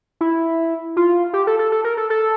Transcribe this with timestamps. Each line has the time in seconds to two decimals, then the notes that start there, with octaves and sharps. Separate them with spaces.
0.21 E4
0.97 F4
1.33 G4
1.47 A4
1.59 A4
1.72 A4
1.84 A#4
1.97 A4
2.10 A4